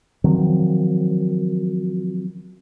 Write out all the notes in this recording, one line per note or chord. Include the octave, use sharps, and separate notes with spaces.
D#3 F3 F#3 C4